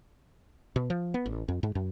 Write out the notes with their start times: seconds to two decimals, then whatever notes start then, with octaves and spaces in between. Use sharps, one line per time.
0.76 B2
0.90 F3
1.14 B3
1.26 A1
1.48 F2
1.63 G#2
1.75 F#2